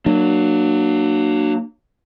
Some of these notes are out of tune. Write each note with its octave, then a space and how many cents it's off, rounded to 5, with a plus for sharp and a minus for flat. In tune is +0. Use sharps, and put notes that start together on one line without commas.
F#3 +5 A#3 +0 D4 +35